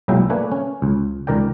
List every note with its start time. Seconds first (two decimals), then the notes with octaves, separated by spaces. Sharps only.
0.08 B1 A#2 F#3 G#3 E4 G5
0.30 A3 A#3 D4 B4 G#5
0.52 C#4
0.82 C#2
1.27 C#2 D#3 A#4 D5 G5